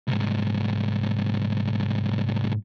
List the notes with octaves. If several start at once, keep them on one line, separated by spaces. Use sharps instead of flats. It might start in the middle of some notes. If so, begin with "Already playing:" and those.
C2 G#2